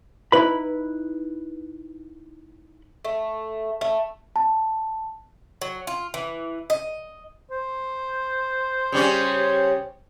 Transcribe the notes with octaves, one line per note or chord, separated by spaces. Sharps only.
D#4 E4 B4 B5
A3
A3
A5
F#3
F4
E3
D#5
C5
C#3 G3 C#4